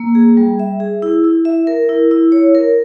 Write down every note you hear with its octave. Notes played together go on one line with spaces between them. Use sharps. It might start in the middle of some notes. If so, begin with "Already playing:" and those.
Already playing: A#3
G#4
G3
E5
G#4
E4
E4
E5
A#4
E4
E4
C#5
A#4